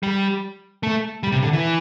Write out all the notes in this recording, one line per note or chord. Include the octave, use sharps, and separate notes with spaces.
G3
A3
G3
C3
D3
E3